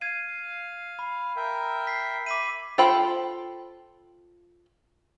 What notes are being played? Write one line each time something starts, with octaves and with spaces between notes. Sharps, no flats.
F5 G#6 C7 D#7
B5
A#4 E5 G5
B6 C7
E5 B5 D6 B6 D#7
F4 A4 C5 G5 B5